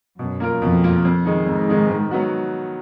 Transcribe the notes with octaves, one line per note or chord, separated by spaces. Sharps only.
F#2 B2
A#3 F4 A#4
F2 B2
A#3 F4 A#4
F2
D#3 G#3 D#4
F2 G#2
D#3 G#3 D#4
D#3
F#3 B3 F#4